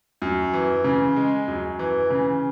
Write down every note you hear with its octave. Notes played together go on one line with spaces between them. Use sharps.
F#2
E3
C#3
G#3
F#2
E3
C#3